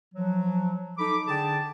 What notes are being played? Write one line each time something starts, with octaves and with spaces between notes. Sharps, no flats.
F3 F#3
D#4 A4 B5 D6
D3 D4 G#4 G5 A5